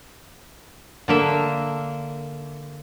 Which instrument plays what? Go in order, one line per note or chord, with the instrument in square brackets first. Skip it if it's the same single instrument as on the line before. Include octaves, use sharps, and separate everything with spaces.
[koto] D3 A#3 E5